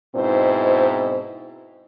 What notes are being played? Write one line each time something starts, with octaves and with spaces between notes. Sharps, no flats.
G#2 B2 C4 E4 C5